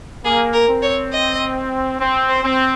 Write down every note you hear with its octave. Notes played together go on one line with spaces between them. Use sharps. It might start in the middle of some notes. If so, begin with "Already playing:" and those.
A#3 G#4
A#4
C4
C#5
D#5
C4
C5
C4